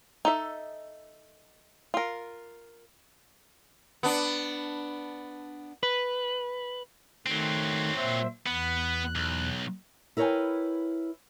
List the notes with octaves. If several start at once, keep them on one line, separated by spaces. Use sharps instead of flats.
D#4 A4 E5
F4 A#4
B3 D4
B4
D#3 F#3 A3 C4
A#2 C5 E5
E2 B3 F#6
B1
E4 A#4 B4 C#5 G5 G#5